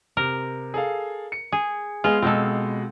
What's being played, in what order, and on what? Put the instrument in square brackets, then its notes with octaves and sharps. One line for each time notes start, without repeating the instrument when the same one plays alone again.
[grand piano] C3 [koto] A#4
[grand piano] G#4 A4 F5
C#7
[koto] G#4
[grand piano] G#3 B3 G#4 [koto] F4
[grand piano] B2 G#3 [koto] C4 A4